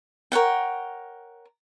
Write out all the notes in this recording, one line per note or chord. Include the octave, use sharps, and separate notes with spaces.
A#4 C#5 F#5 G5